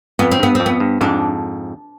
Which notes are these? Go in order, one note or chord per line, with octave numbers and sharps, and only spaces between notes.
F2 B3
C4
G2 B3
F2 C4
B3
G2
F2 G#2 D4